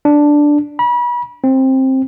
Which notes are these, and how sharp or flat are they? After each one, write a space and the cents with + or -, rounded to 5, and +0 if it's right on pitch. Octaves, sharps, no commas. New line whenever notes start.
D4 +0
B5 -35
C4 +15